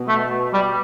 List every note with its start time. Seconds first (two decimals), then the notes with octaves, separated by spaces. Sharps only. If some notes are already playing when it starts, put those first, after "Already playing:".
Already playing: B2
0.08 A3
0.54 G3